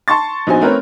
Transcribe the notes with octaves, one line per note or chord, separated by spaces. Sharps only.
A5 C6 C#6 A6
A#1 B3 D#4 F#4 C5 G#5
A3 C4 A#4 B4 C#5